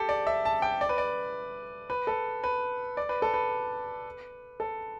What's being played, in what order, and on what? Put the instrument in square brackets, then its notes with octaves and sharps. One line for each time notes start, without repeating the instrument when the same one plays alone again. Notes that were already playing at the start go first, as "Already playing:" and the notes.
Already playing: [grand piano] G4 A4
D5
E5
A5
G5
D5
B4
D5
B4
A4
B4
D5
B4
A4
B4
A4